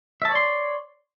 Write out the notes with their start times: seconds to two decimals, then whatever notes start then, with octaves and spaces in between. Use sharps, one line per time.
0.22 E5
0.25 A5
0.28 C#5
0.32 D5
0.35 C6